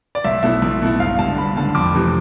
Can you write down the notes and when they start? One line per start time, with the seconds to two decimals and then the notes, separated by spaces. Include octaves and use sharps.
0.15 D5
0.24 B1 E5
0.43 B2 A3 E4 E5
0.62 B1
0.81 B2 A3 E4
0.99 G1 F5
1.18 G2 D3 A5
1.37 G1 B5
1.56 G2 D3 A5
1.75 F2 D6
1.94 C3 E3 A3